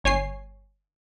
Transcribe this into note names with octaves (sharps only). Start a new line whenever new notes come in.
G1 C#5 G#5 C7